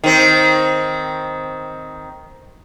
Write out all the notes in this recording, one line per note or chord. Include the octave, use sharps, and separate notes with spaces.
D#3 C4